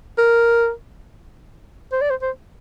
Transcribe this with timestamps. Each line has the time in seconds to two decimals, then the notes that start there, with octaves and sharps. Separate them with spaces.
0.18 A#4
1.92 C5
2.01 D5
2.10 C5
2.22 C5